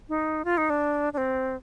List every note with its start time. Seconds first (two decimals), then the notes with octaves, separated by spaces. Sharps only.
0.09 D#4
0.45 F4
0.57 D#4
0.70 D4
1.13 D4
1.17 C4